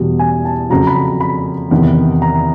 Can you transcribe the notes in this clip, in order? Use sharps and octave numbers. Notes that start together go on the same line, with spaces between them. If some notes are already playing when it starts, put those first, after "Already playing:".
Already playing: E2 B2 G3
G#5
A5
F2 C#3 F#3 A#5
B5
B5
E2 C3 D#3
A#5